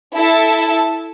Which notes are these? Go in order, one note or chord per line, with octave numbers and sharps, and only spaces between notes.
E4 A4 E5 A5